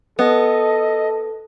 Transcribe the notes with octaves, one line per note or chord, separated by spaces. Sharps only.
B3 A4 D#5